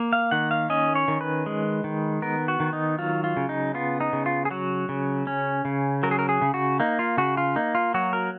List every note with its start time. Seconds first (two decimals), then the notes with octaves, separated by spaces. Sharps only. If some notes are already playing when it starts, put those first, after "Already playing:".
Already playing: A#3
0.13 F5
0.31 D#3 F#5
0.51 F5
0.70 C#4 D#5
0.95 C#5
1.08 D#3
1.21 B4
1.46 G#3
1.84 D#3
2.22 B3 A#4
2.48 F#4
2.60 D#3
2.73 D#4
2.99 F#3 F4
3.24 F4
3.37 C#3
3.49 D#4
3.74 B3 F4
4.01 D#4
4.13 C#3
4.26 F4
4.45 G#4
4.51 F#3 F#4
4.89 C#3
5.27 C#4
5.65 C#3
6.03 F#3 A#4
6.11 G#4
6.19 A#4
6.29 G#4
6.42 C#3
6.54 F#4
6.80 A#3 D#4
6.99 F4
7.17 C#3 F#4
7.37 F4
7.56 A#3 D#4
7.75 F4
7.94 F#3 F#4
8.13 A#4